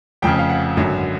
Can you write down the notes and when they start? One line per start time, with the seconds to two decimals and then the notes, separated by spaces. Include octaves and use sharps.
0.22 F1 F2 C#3 G5
0.39 F5
0.49 F#5
0.77 G#1 F#2 D3 F#3